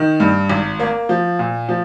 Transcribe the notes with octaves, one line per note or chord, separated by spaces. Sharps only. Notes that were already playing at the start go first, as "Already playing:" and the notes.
Already playing: D#3
G2
G#1
A#3
F3
A#2
F3